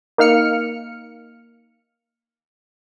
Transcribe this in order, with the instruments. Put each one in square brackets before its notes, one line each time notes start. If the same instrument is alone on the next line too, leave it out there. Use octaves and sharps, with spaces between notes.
[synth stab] A#3 D#4 F5 F6 C#7